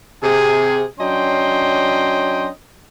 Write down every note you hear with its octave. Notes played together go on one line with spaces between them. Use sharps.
C3 G#4
F#3 C#4 D4 D#5 G5 C6